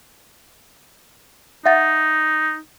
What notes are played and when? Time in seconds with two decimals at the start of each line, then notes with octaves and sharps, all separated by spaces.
1.66 D#4 E5 F#5 A6